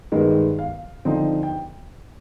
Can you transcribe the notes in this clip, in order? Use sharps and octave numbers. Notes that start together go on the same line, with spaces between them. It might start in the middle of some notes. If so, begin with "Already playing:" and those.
G2 D#3 G#3 B3 D#4
F5
D3 F3 C4 D#4
G5